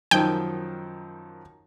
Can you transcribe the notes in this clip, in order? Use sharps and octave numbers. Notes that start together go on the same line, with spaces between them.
F#2 D#3 F3 G5